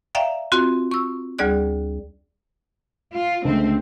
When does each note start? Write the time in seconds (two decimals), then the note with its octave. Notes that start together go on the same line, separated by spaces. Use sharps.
0.15 D5 E5 F5 G5 A#5
0.52 C4 F4 F#4
0.91 C#6 E6
1.39 D2 G3 G#4 D5 F#6
3.12 F4
3.45 C#2 D3 A3 C4